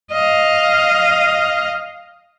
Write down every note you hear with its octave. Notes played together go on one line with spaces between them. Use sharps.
D#5 F5